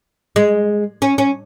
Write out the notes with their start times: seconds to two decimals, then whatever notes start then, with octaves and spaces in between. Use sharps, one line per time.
0.36 G#3
1.02 C#4
1.18 C#4